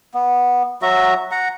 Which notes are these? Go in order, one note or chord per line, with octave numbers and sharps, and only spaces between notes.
B3
F#3 F#4 E5 A#5
F#5 A#5